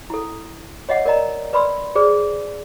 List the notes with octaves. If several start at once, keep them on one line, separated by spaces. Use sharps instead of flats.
E4 A4
C#5 D#5 E5 F#5
A#4 D5 D#5 A#5
B4 D5 B5 C6 E6
G#4 B4 C5 D5